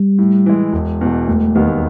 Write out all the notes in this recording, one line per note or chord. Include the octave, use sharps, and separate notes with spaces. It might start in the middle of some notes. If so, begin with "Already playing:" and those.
Already playing: G3
A2
E3 G#3
E1
E2 B2
E1 A3
D#2 D#3 G3 B3